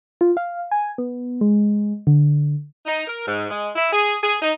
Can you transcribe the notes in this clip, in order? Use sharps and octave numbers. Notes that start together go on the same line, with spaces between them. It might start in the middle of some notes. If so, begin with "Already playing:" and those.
F4
F5
G#5
B3
G#3
D3
D#4
A#4
G#2
G#3
E4
G#4
G#4
D#4